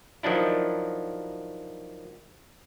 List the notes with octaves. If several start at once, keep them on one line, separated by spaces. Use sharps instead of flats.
D#3 F3 F#3 D4 E4